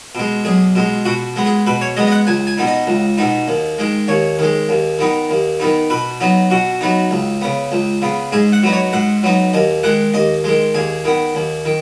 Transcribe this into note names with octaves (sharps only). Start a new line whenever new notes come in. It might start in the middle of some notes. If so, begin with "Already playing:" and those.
B2 G#3
B1 G#4
B2 G#3
B2 F#4
G#3 B3
G#4
B2 B4
C#5
G#3 B3 D#5
D#5
F#5
C#2 G#5
G#5
B2 B3 D#4
D#5
C#2
B2 B3 D#4
D#2
D#3 G#3
D#2 C#5
D#3 G#3
D#2
D#3 B3 D#4
D#2
D#3 B3 D#4
B2 B4
F#3 B3 D#4
B2 F#4
F#3 B3 D#4
C#2
C#3 B3
C#2
C#3 B3
G#2 G#4
F#5
F#3 B3 D#4
C#5
G#2 F#5
F#3 B3 D#4
D#2 D#5
D#3 G#3 F#5
D#2 D#5
D#3 G#3
D#2 G#4
D#3 B3
D#2
D#3